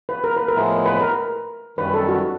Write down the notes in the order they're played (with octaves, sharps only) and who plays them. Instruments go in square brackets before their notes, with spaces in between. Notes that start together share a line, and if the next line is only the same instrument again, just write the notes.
[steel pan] B4
A#4
B4
A#4
[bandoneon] A2 F3 G#3 B3 E4
[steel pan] B4
A#4
[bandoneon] F#2 D#3 G3 [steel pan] B4
[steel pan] A4
F#4